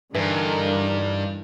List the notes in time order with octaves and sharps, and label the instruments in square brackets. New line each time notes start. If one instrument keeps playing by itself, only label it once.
[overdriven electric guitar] G2 [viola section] D3 D#4 A#4 [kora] E3